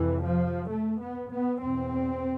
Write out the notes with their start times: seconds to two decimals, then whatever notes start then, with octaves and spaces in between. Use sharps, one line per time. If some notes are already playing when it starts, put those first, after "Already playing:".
Already playing: F2 C3 E3
0.23 F3
0.69 A3
1.00 B3
1.30 B3
1.60 E2 B2 C4